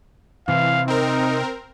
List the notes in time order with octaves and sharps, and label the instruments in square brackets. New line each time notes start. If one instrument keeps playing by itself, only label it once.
[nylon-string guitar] C3 [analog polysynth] E3 [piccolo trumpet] F5
[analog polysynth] C4 A#4 [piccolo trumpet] D#4